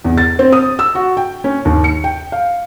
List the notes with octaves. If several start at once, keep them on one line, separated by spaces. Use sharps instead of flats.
E2
A6
C4
D#6
E6
F#4
G5
C#4
D#2
C#7
G5
F5